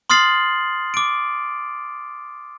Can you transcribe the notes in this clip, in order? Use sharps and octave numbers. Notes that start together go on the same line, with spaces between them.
C6 D#6 F6 A6 C7 F#7
D6 D7